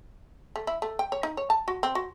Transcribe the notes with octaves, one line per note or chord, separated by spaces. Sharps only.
A3
E4
A3
G5
C#5
D#4
C#5
A5
F#4
C4
F#4